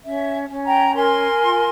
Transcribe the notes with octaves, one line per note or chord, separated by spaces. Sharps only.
C#4 E5
C#4
G5 A#5
A#4 G#5 C6
F4